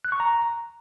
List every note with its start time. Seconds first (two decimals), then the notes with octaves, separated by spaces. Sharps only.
0.05 F#6
0.12 C#6
0.20 A#5